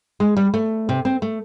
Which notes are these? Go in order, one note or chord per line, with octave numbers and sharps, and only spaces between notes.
G#3
G3
A3
C3
C4
A3